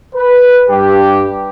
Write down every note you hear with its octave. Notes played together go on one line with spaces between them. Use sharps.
B4
G2 G4